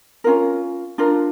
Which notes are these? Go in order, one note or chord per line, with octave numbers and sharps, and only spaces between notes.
C#4 F4 A#4
D4 F4 A#4